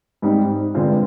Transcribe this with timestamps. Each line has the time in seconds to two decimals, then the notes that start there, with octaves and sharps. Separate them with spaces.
0.22 G#2 G3 C4 D#4 G4
0.74 G2 D3 G#3 C4 F4